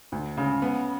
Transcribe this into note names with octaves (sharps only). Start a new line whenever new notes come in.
D2
C#3
B3